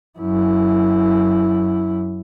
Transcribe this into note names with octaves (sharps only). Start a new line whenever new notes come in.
F#2 E4